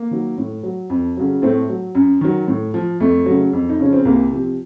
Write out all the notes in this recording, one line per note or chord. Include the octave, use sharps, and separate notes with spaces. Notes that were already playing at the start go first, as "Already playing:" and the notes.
Already playing: A#3
D#3 F#3
A2
F#3
F2
C#3 F#3
A2 A3 C4
F#3
F#2
D#3 F#3
A2
F3
F2 A3
C#3 F#3
F2
D#4
C#3 F3 C#4
C4
C2 A#3
C3 F3